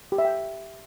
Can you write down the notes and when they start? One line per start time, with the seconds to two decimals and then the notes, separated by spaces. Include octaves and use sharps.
0.12 G4
0.18 E5
0.25 G5